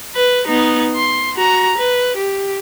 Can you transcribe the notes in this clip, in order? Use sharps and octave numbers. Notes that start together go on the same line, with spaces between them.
B4
B3 D#4
C6
F#4 A#5
B4
G4